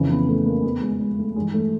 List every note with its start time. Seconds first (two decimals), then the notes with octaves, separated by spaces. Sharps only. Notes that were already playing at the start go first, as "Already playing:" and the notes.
Already playing: F2 C#3 E3
0.09 B3
0.28 A3
0.46 A#3
0.63 E2 B2 B3
0.81 G#3
1.00 G#3
1.18 A3
1.36 G2 G#3
1.40 E3
1.54 A3